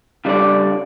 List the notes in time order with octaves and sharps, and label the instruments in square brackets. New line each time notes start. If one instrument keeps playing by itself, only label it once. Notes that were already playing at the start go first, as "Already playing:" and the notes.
[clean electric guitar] C#3 G3 D4 A4 D5